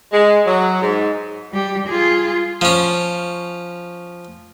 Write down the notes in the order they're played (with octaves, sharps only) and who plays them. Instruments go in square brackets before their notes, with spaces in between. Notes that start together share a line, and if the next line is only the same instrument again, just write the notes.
[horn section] G#3
F#3
G#2
[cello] G3 G4
F4 G#4
[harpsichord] F3 C#4